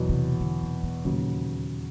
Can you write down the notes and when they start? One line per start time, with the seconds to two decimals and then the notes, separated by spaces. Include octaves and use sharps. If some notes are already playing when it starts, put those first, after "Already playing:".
Already playing: E2 B2 F#3
0.09 C3
0.41 D3
0.63 C3
0.84 B2
1.05 D#2 A#2 C#3 F#3